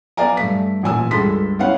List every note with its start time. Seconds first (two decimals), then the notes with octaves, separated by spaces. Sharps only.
0.17 B3 D5 F5 G#5 A#5
0.37 G2 A3 B6
0.83 A1 A#2 G#5 E6
1.11 C#2 G2 G#3 A4 C6 B6
1.59 B3 C#4 E4 C#5 F5 F#5